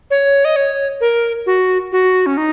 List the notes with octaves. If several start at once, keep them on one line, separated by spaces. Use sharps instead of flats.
C#5
D#5
C#5
A#4
F#4
F#4
C#4
D#4